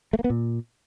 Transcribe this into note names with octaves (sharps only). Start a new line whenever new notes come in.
A3
A#3
B3
A#2